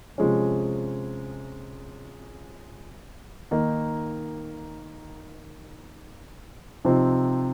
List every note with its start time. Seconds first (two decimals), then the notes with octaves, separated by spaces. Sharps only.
0.18 C3 F3 G#3 C#4
3.51 D#3 A#3 D#4
6.85 C3 F3 C4 D#4